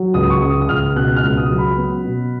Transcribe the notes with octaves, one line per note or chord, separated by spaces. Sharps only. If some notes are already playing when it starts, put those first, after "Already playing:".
Already playing: F#3
C#2 D#6
C#6
C#3 D#6
D#6
C#2 F6
B2 F#6
F6
C#2
D#6
F#3
B5
B3
B2